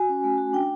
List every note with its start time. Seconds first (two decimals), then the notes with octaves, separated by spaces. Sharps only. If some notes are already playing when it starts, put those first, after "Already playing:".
Already playing: F#4 G#5
0.09 C#4
0.24 A3
0.38 F#4
0.53 D4 G5